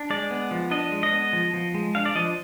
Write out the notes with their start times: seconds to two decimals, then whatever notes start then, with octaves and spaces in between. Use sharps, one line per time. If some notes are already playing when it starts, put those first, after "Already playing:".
Already playing: D4
0.10 G#3 D5
0.31 B3
0.51 F3
0.71 D4 D#5
0.92 G#3
1.03 D#5
1.13 B3
1.33 F3
1.54 F3
1.74 G#3
1.95 D4 F5
2.06 D5
2.15 F3 D#5